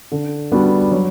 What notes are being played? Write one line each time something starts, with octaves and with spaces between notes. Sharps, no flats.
D3
G3 B3 D4 F#4
F#3